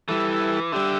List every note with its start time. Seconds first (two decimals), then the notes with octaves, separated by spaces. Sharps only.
0.08 E3 G3 E4 A4
0.72 D3 G3 D4 G4 E5